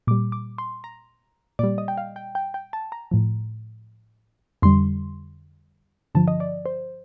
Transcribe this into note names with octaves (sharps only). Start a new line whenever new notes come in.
A#2 G3 D6
D6
C6
A#5
A#2 G3 D5
D#5
G5
F5
G5
G5
G5
A5
A#5
A2 F3
F2 D3 G3 C6
G2 D3 F3 A5
D#5
D5
C5